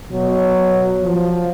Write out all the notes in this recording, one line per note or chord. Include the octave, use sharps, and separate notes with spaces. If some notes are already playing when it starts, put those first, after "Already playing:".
B2 F#3
F3